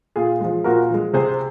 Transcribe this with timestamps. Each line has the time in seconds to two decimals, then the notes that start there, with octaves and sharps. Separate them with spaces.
0.16 A#2 F4 G#4
0.40 F3 G#3
0.64 A#2 F#4 A#4
0.90 F3 G#3
1.13 C3 G#4 C5